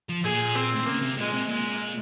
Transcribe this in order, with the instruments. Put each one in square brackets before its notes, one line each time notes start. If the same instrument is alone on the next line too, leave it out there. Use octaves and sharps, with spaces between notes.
[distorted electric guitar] F3
[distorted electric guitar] A#2 [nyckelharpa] G#4
[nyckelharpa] C4
[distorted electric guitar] C#3 [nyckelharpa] A#3
[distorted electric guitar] C3
[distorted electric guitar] A#2 [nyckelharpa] G#3
[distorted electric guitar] C3
[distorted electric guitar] A#2 [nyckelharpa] G#3